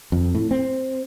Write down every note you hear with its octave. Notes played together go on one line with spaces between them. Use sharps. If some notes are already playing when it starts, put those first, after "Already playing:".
F2
A2
C4